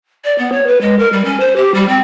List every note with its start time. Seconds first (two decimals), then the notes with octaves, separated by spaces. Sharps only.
0.24 D5
0.38 B3
0.52 C#5
0.67 B4
0.81 G#3
0.99 A#4
1.12 G3
1.25 C#4
1.40 C5
1.56 G4
1.74 G3
1.88 C4